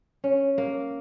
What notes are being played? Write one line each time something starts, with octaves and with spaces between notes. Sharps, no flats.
C#4
A#3